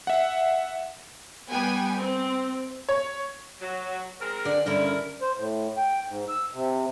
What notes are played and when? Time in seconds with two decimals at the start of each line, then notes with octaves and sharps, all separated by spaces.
0.07 E5 F#5
1.50 G3 B3 G5 G#5
1.99 C4
2.89 C#5
3.61 F#3
4.20 G#3 C4 A#4
4.45 D3 D5
4.66 G2 D3 C#4 E4 A#4
5.22 C5
5.37 A2
5.77 G5
6.08 G#2
6.29 E6
6.53 C3